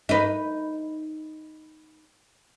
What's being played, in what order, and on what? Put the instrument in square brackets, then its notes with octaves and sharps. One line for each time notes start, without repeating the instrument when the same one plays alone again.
[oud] D#4 B4